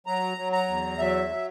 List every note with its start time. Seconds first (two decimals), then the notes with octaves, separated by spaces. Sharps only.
0.07 F#3 A#5
0.37 F#3
0.53 A#5
0.68 E2
0.98 F#3 E5
1.29 F#3